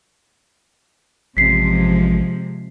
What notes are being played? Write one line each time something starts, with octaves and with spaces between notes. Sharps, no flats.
A1 C3 F3 G#3 B6 C7